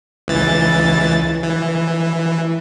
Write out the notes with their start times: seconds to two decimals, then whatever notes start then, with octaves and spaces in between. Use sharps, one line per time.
0.28 C#2 E3 A6
1.43 E3